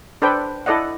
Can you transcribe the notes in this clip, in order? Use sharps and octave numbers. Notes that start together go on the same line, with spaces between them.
D4 A4 B4 C5 D5 G5
E4 A4 D5 D#5 F#5